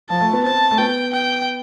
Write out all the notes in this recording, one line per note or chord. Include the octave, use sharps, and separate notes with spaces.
F3 A5
A3
B3
C4 A5
A3
B3 G5
G5